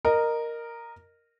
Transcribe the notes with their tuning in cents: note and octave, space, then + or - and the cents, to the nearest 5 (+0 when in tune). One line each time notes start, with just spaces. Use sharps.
A#4 +0 D#5 -20